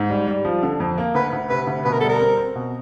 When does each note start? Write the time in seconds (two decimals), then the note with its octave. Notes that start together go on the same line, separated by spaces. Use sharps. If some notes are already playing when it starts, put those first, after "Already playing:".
Already playing: G#2
0.10 G3
0.27 G3
0.45 F3
0.63 D3
0.80 F2
0.98 A#3
1.15 D2 B4
1.33 D2
1.49 C3 B4
1.67 D2
1.85 B2 B4
1.93 A#4
2.00 G3 A4
2.09 A#4
2.20 C4
2.37 C4
2.56 B2